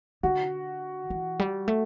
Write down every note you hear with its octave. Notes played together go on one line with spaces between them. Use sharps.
D3 F#4
E3
G3
A3